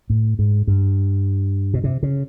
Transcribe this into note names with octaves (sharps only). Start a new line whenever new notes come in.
A2
G#2
G2
B2
C3
C#3